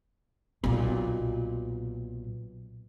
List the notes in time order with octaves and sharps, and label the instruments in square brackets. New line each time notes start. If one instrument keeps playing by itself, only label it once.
[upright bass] B1 A#2